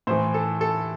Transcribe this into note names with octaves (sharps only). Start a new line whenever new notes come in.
A2 E3 C5
A4
A4